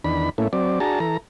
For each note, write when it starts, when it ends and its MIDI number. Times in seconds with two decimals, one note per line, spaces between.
0.04 0.30 40
0.04 0.30 51
0.04 0.30 62
0.04 0.30 83
0.38 0.48 45
0.38 0.48 57
0.38 0.48 58
0.38 0.48 61
0.38 0.48 64
0.53 0.79 54
0.53 0.79 60
0.53 0.79 74
0.80 0.99 62
0.80 0.99 66
0.80 0.99 68
0.80 0.99 81
0.80 0.99 82
1.00 1.17 52
1.00 1.17 69
1.00 1.17 82